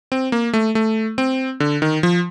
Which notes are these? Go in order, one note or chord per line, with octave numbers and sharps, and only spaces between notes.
C4
A#3
A3
A3
C4
D3
D#3
F3